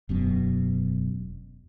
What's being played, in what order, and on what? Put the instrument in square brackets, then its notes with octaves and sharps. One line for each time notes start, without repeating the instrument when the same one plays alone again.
[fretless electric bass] E1 F#2 B2